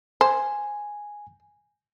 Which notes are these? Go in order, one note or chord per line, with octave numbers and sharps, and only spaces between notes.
C5 G#5